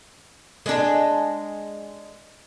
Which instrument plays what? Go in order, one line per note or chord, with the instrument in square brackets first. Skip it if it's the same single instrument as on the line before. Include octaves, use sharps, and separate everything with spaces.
[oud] G#3 D4